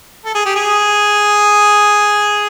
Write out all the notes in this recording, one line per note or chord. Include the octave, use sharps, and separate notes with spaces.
A4
G#4
G4
G#4